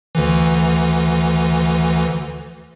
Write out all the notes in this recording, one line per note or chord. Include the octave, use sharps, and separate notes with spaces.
D2 D3 E3